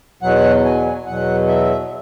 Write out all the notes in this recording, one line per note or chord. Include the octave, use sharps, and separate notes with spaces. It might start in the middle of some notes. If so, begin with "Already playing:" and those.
E2 B2 F#3 F#5
G#5
E2 B2 F#3 F#5
E5